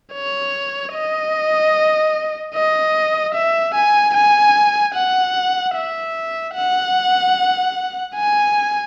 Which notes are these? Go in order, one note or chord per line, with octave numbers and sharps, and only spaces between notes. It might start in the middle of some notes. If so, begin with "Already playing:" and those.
C#5
D#5
D#5
E5
G#5
G#5
F#5
E5
F#5
G#5